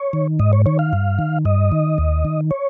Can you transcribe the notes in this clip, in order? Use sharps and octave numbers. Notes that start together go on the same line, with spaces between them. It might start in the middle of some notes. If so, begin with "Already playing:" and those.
Already playing: C#5
D#3
G#2 D#5
C#5
D#3 C#5
F5
G2
D#3
G2 D#5
D#3
D#2
D#3
C#5